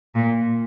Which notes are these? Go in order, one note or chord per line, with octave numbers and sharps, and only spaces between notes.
A#2